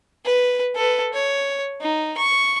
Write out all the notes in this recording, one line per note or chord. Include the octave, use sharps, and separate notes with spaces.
B4
A4 B4
C#5
D#4
C#6